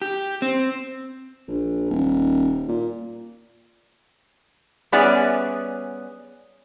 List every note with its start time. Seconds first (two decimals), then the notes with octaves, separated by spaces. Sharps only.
0.02 G4
0.42 C4
1.48 A#1
1.91 D#1
2.69 A#2
4.92 G3 B3 C#4 G#4 D5 E5